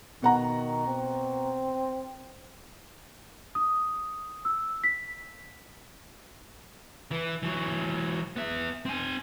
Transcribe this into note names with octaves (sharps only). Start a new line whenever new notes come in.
B2 D#3 F#5 A#5
C4
D#6
E6
B6
E3 E4
E3 F#3
B3 E5
C4 G#5